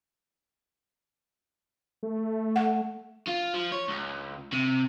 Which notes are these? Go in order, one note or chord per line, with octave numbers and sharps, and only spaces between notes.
A3
F#5
F4
F3
C#5
C#2
C3